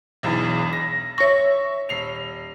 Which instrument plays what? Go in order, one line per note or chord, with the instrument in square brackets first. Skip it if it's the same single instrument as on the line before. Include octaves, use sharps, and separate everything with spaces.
[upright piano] E1 B1 E2
A#6
[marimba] C#5 A#6 [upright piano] E5 C#6
[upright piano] D#1 C7 F7